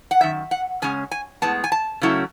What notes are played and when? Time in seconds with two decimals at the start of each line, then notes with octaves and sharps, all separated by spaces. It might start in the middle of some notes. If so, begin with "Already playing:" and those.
0.11 F#5
0.21 F#2 D#3 E5
0.51 F#5
0.82 C#3 G#3 C#4 G#5
1.11 G#5
1.42 A2 G#3 B3 A5
1.64 G#5
1.72 A5
2.01 C#3 F#3 A3 C#4 E4